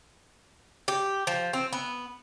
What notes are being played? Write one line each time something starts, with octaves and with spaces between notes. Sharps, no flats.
G4
F3
C4
B3